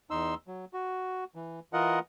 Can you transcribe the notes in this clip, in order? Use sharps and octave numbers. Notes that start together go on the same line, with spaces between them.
E2 D#4 C6 E6
F#3
F#4
E3
E3 F4 A#4 D#5 F#5